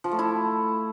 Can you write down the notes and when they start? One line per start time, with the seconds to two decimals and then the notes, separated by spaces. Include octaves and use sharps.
0.04 F3
0.11 A3
0.19 E4